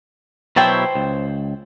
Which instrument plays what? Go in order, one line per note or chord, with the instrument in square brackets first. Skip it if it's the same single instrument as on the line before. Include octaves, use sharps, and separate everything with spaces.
[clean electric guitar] B2 F#3 E4 [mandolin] C5 G5 A5
[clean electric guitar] C#2